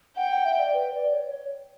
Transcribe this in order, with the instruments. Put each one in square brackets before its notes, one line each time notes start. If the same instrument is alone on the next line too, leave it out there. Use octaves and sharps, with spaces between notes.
[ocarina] F#5 [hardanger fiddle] G5
[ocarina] F#5
E5
D5
B4
D5
C#5